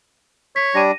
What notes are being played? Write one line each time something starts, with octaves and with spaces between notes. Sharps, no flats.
C#5 B6
G3 D4 A#6 D#7